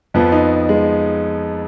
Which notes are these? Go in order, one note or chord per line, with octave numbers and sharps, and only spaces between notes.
F2 F3 B3
D#4
G#3